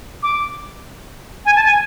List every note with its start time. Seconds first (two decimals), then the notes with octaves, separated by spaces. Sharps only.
0.23 D6
1.45 G#5
1.56 A5
1.65 G#5